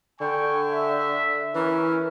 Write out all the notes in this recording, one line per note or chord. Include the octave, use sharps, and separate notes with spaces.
D3 G5 G#5 C#6
E5
E3 C#4 A#4